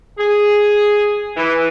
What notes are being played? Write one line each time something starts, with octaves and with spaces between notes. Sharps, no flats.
G#4
E3